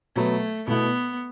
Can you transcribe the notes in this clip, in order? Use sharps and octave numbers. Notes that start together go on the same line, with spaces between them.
B2 F#3 A3 B3
B2 A3 B3 E4